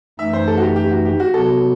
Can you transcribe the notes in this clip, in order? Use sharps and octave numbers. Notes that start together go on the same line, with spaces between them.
F#2 E3 A3 D#4 E5
C5
A4
F#4
G4
G4
F#4
G4
F#4
C3 F#3 B3 F#4 A4